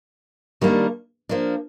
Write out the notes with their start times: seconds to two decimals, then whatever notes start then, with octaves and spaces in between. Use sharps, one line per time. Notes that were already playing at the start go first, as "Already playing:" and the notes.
0.61 D#3 G3 A#3 D4
1.29 F3 A#3 D4